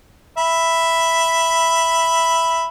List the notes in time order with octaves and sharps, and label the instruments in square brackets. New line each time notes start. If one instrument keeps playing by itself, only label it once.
[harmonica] E5 B5